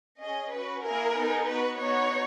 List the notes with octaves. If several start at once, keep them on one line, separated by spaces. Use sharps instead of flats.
C#4 G#4 D#5
C#4 F#4 B4
A#3 E4 G#4 A#4
B3 D#4 G#4
B3 F#4 B4
B3 D#4 F#4 C#5